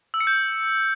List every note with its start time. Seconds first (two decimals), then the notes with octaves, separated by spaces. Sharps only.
0.14 E6
0.20 C#7
0.27 G6